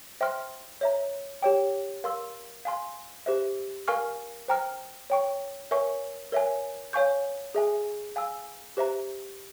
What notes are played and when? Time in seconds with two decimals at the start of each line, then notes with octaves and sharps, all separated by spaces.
0.21 C5 E5 G5 C6 F6
0.81 C#5 E5 A#5
1.42 G4 C#5 G5
2.04 A#4 F5 C6 E6
2.65 F5 G#5 C6
3.26 G4 C5 E5
3.88 A#4 F5 G#5 C#6 F6
4.48 C5 G5 A#5 F6
5.10 C#5 G5 C#6
5.71 A#4 C#5 E5 G#5 C#6
6.32 A#4 C#5 E5 G#5
6.93 C#5 F5 G#5 C#6 G6
7.55 G#4 E5 G#5
8.16 F5 G#5 E6
8.77 G4 C5 E5 A#5